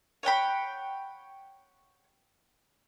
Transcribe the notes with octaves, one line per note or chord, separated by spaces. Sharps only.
C#5 F#5 G5 B5